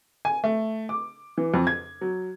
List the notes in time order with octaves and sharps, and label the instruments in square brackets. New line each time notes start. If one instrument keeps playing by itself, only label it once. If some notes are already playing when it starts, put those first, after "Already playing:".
[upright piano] G#5
A3
D6
E3
F2
G#6
F#3